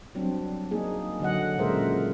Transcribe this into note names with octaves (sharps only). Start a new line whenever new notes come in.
F#3 G3 C4 D4
A#3 D#4 G#4
D3 F#3 D#5 F#5
A#2 C#3 G#3 A#4 C5 E5